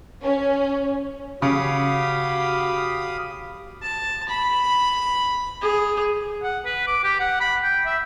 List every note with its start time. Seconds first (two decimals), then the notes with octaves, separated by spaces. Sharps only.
0.23 C#4
1.42 C#3 F#4 G4 F5 B5 D#6
3.82 A5
4.29 B5
5.61 G#4
6.43 F#5
6.65 B4
6.87 D6
7.04 G4
7.20 F#5
7.40 B5
7.63 G5
7.86 E5